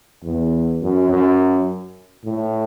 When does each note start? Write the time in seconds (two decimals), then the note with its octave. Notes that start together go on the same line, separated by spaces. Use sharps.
0.24 E2
0.81 F#2
1.09 F#2
2.24 A2